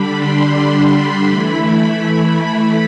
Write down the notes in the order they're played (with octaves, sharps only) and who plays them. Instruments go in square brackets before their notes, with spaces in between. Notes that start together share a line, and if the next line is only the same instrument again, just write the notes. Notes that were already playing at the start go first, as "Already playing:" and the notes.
Already playing: [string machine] D3 G3 D4 B5
C6
E3 A3 E4 B5
B5
B5
B5